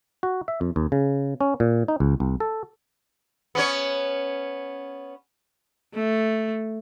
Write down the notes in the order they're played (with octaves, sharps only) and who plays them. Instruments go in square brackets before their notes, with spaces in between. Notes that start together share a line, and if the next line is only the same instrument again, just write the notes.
[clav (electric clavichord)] F#4
E5
F2
D#2
C#3
C#4
A#2
D#4
C#2
C2
A4
[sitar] B3 C#4 C#5
[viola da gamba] A3